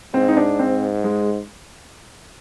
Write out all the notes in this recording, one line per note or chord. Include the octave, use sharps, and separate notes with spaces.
G#2 C4
D#4
D4
C4
G#3